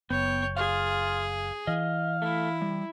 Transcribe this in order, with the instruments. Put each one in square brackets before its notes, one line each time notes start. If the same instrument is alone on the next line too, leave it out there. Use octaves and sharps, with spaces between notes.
[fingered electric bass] F#1 [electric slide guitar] B3 [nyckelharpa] C#5 [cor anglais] G5
[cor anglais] F4 [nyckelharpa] G#4 [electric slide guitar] F5
[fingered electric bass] E3 [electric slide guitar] D#5 [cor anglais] F5
[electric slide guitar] A3 [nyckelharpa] E4
[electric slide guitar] G3